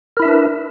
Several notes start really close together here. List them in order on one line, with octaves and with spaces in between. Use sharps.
A#4 E4 E5 D4 B4